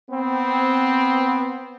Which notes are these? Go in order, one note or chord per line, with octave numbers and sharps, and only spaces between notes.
B3 C4